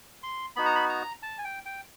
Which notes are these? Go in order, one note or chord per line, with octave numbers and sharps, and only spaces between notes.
C6
B3 D#4 F#4 B5
A#5
B5
A#5
A5
G#5
G5
G5